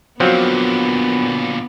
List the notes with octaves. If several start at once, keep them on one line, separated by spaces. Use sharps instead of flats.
A#2 D3 F3 F#3 B3 C4